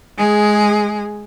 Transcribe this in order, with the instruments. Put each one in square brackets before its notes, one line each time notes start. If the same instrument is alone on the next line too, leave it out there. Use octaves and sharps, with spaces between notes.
[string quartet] G#3 G#4